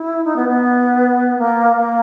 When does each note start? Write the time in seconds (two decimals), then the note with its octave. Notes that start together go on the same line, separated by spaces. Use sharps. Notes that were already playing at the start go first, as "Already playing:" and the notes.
Already playing: E4
0.24 D#4
0.36 B3
0.48 B3
1.38 A#3
1.75 A#3